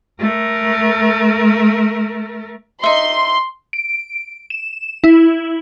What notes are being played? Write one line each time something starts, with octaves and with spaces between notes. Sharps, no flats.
A3 A#4
D#4 E5 C6
D7
E7
E4